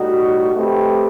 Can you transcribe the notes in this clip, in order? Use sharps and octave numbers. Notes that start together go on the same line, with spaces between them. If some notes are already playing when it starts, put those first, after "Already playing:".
Already playing: A2 G3 D#4 F#4
A3 C4 D#4 G4 B4